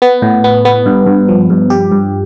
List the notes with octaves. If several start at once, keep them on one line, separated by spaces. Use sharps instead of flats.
B3
A2
B3
B3
G2
G2
F3
G2
G4
G2